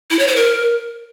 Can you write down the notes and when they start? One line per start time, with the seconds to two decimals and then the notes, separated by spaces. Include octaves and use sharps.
0.11 E4
0.19 C#5
0.28 C5
0.36 A#4